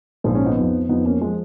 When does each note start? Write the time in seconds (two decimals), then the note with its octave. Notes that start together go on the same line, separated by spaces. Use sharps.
0.24 A#1 G#2 F3 D#4
0.35 C#4
0.46 B3 D#4
0.57 F2 F3
0.89 F2 F3 B3 D#4
1.05 A#3 C#4
1.21 F3 G#3